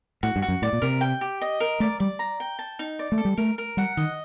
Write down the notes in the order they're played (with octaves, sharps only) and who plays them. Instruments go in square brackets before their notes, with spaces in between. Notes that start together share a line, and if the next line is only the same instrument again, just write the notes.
[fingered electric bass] A2 [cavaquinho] F#4
[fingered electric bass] G2
[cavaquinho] F#4
[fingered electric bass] F#2
[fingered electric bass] A2 [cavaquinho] D5
[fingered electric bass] A#2
[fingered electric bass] C3 [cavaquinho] A#4
[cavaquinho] G5
G4
D#5
A#4
[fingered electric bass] A3 [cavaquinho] D5
[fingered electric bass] G3 [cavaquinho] D5
[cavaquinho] A#5
G5
A5
D#4
D5
[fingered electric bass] A3
[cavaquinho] A4
[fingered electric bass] G3
[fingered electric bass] A3 [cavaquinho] A#4
[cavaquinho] A#4
[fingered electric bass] G3 [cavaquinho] F#5
[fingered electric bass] D#3 [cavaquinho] D#5